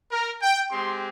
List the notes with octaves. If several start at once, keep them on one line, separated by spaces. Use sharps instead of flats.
A#4
G5
G#3 C4 G4 C6